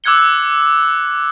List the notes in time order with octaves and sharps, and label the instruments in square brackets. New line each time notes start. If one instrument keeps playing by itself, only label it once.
[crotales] D6 E6 F#6 G#6 C#7 G7